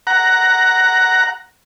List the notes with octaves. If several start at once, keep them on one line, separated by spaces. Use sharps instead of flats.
F#5 A#5